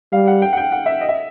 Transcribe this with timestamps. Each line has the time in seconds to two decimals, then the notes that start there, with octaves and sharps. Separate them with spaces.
0.12 G3 F5
0.27 F#5
0.42 G5
0.53 F#5
0.57 G5
0.72 F#5
0.86 E5
1.01 D#5
1.09 E5